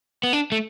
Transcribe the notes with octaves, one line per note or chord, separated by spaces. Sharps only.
B3
D4
A3